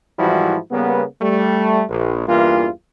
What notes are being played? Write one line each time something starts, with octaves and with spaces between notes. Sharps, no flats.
G#2 E3 F3 G3 E4 F#4
C#3 G3 A#3 B3
G3 A3
A#1
E2 G2 E3 A#3 F4